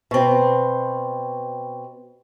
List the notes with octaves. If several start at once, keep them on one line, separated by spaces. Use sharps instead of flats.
B2 C4